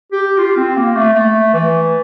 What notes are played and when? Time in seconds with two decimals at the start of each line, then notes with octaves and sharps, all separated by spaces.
0.12 G4
0.38 F4
0.57 C4
0.77 A#3
0.96 A3
1.15 A3
1.54 E3